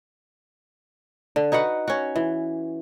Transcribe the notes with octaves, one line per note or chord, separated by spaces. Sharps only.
D3
D#4 F#4 B4 F#5
C#4 F#4
E3